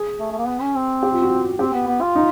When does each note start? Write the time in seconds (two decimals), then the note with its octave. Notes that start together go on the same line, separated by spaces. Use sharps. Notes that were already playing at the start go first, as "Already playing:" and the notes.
Already playing: G#4
0.19 A3
0.32 A3
0.38 A#3
0.47 B3
0.61 C#4
0.75 C4
1.03 G4
1.12 F4
1.22 F#4
1.59 C4 G4
1.73 B3
1.87 B3
2.01 F4
2.15 D#4